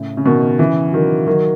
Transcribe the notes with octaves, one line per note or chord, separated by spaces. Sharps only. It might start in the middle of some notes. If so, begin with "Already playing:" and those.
Already playing: A2 C#3
C#3
B2 D#3
C#3 E3
D#3 F#3
D#3 F#3